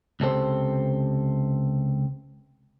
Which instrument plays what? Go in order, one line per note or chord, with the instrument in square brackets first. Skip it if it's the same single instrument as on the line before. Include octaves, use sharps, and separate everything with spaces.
[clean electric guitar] C#2 C3 A4 C5